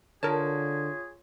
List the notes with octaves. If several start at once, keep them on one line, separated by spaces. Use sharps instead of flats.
D3 F4 G#4 A#4 C#5 A5